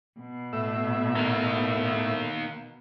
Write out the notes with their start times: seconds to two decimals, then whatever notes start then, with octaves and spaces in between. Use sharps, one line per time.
0.19 B2
0.53 A2 E5
1.16 D#3 A#3